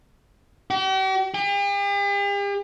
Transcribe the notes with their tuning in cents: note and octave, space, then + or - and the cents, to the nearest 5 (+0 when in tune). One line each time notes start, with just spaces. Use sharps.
G4 -45
G4 +45